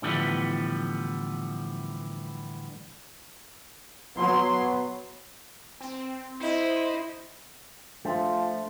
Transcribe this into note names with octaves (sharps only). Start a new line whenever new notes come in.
A2 D3 E3 F3 G3 B3
F#3 B3 C6
C4
E4 C5 D#5
F3 A3 D4 C6